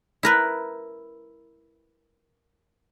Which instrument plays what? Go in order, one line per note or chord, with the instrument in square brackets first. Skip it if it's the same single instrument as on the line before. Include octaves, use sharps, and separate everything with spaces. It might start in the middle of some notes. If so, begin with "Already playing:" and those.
[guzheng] E4 A#4 B4